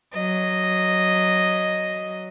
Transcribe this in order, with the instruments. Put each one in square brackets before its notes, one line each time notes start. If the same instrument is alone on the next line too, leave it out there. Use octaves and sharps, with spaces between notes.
[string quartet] F#3 D#5